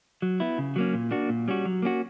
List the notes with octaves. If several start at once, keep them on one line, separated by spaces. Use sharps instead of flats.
F#3
B3 E4
C#3
F#3 A#3 C#4
A#2
A#3 D4 F#4
A#2
G3 C#4 F#4
F#3
A#3 C#4 F#4